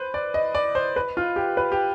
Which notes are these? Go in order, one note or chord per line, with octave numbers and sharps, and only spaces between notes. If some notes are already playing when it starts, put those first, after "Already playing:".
Already playing: B4 C5
D5
D#5
D5
C5
B4
F4
G4
B4
G4